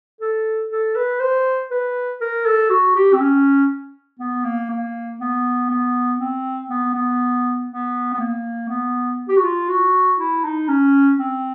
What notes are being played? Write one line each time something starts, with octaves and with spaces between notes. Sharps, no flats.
A4
A4
B4
C5
B4
A#4
A4
F#4
G4
C4
C#4
B3
A#3
A#3
B3
B3
C4
B3
B3
B3
B3
A#3
B3
G4
F#4
F4
F#4
E4
D#4
C#4
C4